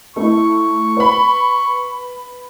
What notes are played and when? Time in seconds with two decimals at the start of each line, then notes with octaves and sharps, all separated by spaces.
0.16 A3 E4 C#6
0.97 B4 B5